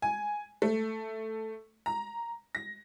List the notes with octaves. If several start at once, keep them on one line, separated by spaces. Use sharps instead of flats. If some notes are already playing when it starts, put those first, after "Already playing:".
G#5
A3
A#5
A#6